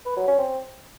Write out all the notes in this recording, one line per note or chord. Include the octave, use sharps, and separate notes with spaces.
B4
F#3
C#4
C4